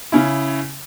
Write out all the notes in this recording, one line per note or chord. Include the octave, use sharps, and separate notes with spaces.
C#3 C#4 E4